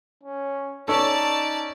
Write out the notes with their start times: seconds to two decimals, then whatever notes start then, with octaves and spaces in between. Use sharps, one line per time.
0.23 C#4
0.88 C#4 D#4 A4 D5 A5